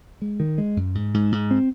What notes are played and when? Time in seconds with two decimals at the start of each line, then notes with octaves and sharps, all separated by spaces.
0.22 G#3
0.40 D#3
0.58 G#3
0.77 F#2
0.95 G#2
1.14 G#2
1.32 G#2
1.51 C4